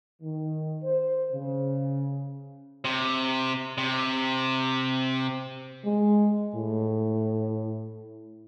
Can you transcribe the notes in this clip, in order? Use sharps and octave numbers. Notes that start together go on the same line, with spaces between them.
D#3
C5
C#3
C3
C3
G#3
A2